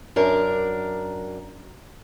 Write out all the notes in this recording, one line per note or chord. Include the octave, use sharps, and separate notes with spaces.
F#2 D4 A#4